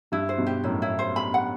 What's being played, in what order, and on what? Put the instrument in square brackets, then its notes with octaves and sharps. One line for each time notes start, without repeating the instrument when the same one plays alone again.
[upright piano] G2 [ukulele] E4
[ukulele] C5
[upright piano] G2 B2
[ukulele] G4
[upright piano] F#2 A2 [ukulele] E4
[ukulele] E4
C5
B5
F#5